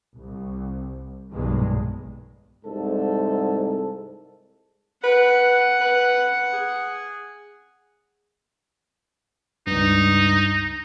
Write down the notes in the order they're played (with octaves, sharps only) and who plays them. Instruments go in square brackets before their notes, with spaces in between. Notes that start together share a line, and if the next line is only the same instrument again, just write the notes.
[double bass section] C2
B1 E2 G2 A#2 D#3 G#3
[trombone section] C2 G#2 A4
[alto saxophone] B4 [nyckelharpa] F#5
[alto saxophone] B4
G#4
[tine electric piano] C#2 G2 [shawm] D#4